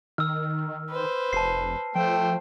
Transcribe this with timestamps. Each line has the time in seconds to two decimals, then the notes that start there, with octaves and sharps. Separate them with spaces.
0.18 D#3 E6 F6
0.90 B4 C5
1.33 F1 A5 C7
1.95 F3 A3 C5 G5